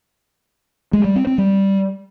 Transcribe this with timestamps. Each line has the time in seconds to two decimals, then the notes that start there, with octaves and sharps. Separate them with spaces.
0.93 G#3
1.04 G3
1.16 C4
1.27 C4
1.38 G3